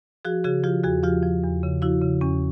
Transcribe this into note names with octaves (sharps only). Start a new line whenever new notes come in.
F3 F#4 G#4
C#3 F#4 G#4
F3 F4 G4
E2 F#4 G#4
F3 F4 G4
F3
E2
C#3
F3 E4 F#4
C#3
E2 C#4